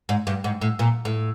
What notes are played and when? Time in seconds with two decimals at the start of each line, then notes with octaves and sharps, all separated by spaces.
0.09 G#2
0.27 G2
0.44 G#2
0.61 A2
0.79 A#2
1.05 A2